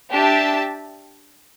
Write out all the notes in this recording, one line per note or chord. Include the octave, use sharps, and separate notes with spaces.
D4 G4 E5 A5